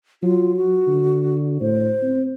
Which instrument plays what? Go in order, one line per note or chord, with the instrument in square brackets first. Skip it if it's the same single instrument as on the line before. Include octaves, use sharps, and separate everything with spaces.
[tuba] F#3 [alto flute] F4
[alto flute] F#4
[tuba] D3
[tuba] A2 [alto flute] C5
[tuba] C4